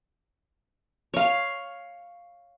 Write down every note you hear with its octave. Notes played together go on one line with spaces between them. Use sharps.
C#5 F5